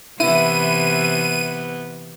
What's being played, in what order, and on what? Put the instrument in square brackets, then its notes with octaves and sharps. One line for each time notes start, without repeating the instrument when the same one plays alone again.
[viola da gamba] C3 E3 [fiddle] B3 [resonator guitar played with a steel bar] E4 [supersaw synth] D#7